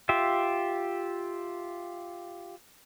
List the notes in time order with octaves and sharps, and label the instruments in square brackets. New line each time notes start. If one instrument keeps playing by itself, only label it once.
[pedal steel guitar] F4 G4 E5